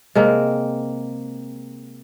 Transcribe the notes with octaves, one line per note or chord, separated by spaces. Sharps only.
C3 G#3 A#3